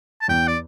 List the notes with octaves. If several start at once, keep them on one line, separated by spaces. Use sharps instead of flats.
A5
E2 G5
D5